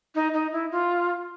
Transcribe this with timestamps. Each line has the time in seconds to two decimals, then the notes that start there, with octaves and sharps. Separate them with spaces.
0.15 D#4
0.34 D#4
0.53 E4
0.71 F4